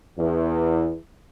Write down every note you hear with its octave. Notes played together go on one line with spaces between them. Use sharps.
E2